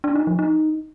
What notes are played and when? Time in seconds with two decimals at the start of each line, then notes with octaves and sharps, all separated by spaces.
0.04 D4
0.16 D#4
0.27 F3
0.39 D#4